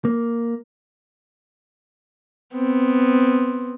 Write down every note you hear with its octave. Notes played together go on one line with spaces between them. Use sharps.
A#3
B3 C4